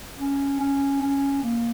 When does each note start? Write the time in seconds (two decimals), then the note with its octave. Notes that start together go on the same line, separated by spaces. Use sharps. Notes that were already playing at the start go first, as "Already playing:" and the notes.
0.18 C#4
0.60 C#4
1.02 C#4
1.43 A#3